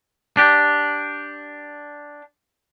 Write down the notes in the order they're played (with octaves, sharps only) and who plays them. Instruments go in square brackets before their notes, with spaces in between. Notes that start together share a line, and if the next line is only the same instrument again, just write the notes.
[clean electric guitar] D4 G4